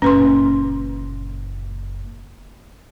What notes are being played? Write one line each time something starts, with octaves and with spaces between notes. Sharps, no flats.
F#1 A#2 C#4 B4 C6